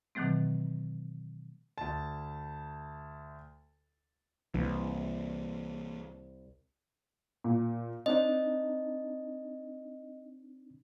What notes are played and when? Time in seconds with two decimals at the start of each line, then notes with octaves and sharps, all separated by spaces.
0.15 B2 D#3 E3 F#3 A3 C4
1.78 D2 A5
4.54 C2 E3 A#3 D4
7.44 A#2
8.06 C4 D4 D#4 D#5